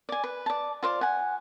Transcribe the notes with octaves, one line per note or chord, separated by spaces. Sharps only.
D5 G#5
B4
D5 A5
F4 C5 D5
F#5 G#5